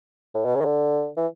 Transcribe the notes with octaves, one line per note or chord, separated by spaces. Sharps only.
A2
B2
C#3
D#3
D3
E3